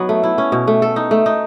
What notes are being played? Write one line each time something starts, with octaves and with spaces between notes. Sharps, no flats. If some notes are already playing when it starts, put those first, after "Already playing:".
Already playing: F#3 B3 D#4
A3
E4
C#4
B2
A3
A4
D#4
A3
D#4